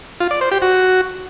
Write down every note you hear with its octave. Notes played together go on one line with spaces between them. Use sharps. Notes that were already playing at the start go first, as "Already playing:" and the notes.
F4
D5
C5
G4
F#4